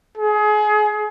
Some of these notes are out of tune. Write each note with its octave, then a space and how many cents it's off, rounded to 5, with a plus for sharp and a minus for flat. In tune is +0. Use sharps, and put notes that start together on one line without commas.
G#4 +25